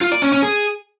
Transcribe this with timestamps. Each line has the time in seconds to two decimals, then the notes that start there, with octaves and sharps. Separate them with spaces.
0.01 F4
0.12 D5
0.22 C#4
0.32 C#4
0.43 G#4